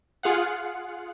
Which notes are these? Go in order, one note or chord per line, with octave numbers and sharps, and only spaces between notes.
F4 G#4 F5 F#5